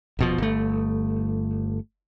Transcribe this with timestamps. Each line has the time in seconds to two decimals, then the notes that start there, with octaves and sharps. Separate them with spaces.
0.19 D#1 B2 F3
0.38 G1 A3